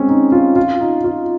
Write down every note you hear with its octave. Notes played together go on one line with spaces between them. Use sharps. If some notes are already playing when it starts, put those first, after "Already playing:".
Already playing: G#3 C4 C#4
D#4
F4
F4
D#4
F4